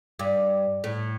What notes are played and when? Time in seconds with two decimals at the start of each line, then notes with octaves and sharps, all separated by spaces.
0.19 G2
0.84 A2